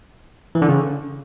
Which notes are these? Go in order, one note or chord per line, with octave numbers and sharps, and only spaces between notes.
E3
D3
C#3